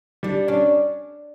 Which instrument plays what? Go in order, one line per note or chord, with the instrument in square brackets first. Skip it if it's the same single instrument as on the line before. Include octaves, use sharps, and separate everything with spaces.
[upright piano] G3 [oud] D4
[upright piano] C#4 [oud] D4